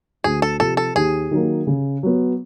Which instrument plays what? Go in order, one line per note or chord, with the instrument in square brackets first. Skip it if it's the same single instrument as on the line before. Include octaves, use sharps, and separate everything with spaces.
[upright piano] D2 [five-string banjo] G#4
[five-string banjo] A4
[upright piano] C3 F3 [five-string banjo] A4
[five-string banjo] A4
[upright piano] D#2 [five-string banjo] G#4
[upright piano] D#3 F#3 A#3
C#3
F#3 B3